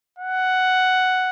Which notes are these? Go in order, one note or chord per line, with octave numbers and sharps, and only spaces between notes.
F#5